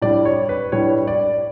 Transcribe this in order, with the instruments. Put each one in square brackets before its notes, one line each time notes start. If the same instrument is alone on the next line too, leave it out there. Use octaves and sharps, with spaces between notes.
[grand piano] A2 G3 D4 D5
C#5
B4
A2 G3 D4 C#5
D5